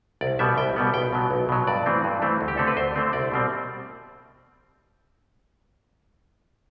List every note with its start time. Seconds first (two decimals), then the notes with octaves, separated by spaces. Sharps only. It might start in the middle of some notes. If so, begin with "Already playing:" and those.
0.21 C2 D5
0.39 B2 G3 B3 E5
0.57 C2 G5
0.76 B2 G3 B3
0.94 B1 G5
1.13 B2 F#3
1.31 B1
1.49 B2 F#3
1.67 G2 D5
1.86 E3 A3 C4
2.04 G2
2.22 E3 A3 C4
2.41 D2
2.48 G4
2.57 D3 A3 C4 A4
2.67 B4
2.77 D2 C5
2.96 D3 A3 C4
3.13 C2 D5
3.32 B2 G3 C4